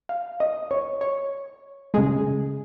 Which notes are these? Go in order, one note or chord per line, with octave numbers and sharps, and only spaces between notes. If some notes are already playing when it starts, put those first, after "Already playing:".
F5
D#5
C#5
C#5
C#3 G#3 G#4